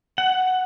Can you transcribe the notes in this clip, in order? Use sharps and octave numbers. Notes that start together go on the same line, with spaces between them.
F#5